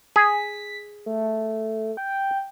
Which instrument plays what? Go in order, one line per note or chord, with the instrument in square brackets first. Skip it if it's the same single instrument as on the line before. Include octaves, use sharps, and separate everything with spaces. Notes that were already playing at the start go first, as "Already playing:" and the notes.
[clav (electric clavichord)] G#4 [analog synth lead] B6
[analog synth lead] A3
G5